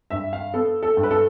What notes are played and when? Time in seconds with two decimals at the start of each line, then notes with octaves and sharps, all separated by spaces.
0.10 G2 E5
0.33 F5
0.54 B3 A4
0.83 A4
0.97 G2
1.03 B4
1.11 A4